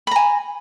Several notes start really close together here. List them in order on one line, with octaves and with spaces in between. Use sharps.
B5 A#5 G#5